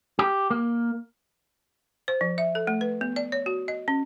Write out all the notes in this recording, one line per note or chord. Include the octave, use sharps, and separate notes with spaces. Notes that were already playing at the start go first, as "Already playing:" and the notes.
G4
A#3
C5
F3
E5
A4
A3
B4
B3
D5
C#5
F#4
D#5
C#4